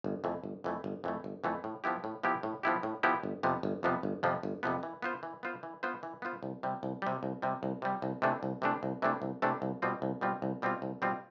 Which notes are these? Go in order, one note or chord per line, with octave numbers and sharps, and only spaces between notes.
G1
F2 E3 A3
G1
F2 E3 A3
G1
F2 E3 A3
G1
F2 E3 A3
A2
F3 B3 E4 G4
A2
F3 B3 E4 G4
A2
F3 B3 E4 G4
A2
F3 B3 E4 G4
G1
F2 C3 F3 B3
G1
F2 C3 F3 B3
G1
F2 C3 F3 B3
G1
F2 C3 F3 B3
E3
B3 F4 C5
E3
B3 F4 C5
E3
B3 F4 C5
E3
B3 F4 C5
C2
C3 G3
C2
C3 G3
C2
C3 G3
C2
C3 G3
C2
C3 E3 A3 D4
C2
C3 E3 A3 D4
C2
C3 E3 A3 D4
C2
C3 E3 A3 D4
C2
B2 G3 C4 F4
C2
B2 G3 C4 F4
C2
B2 G3 C4 F4
C2
B2 G3 C4 F4